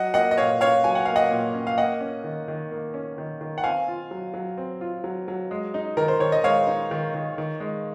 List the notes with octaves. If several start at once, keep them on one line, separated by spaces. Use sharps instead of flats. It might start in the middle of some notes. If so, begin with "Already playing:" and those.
Already playing: F#3 D#5 F#5
A#3 D#5 F#5
D#5
A#2 C#5 F5
C#4 C#5 F5
F#3 G#5
F#5
A#3 F5
D#5 F#5
A#2
C#4
F5
A#3 D#5 F#5
C#4
D#3
D#3
A#3
C#4
D#3
D#3
F#5
C4 F5 G#5
F4
F#3
F#3
C4
F4
F#3
F#3
G#3
D#4
D#3 A#4
C5
D#3 C#5
D#5
G#3 C#5 F5
D#4
D#3
D#3
D#3
G#3